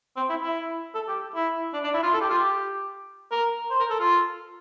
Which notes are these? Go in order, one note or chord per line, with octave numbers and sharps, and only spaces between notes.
C4
E4
E4
A4
G4
E4
D4
D4
E4
F4
A4
G4
F4
G4
A#4
C5
A#4
A4
F4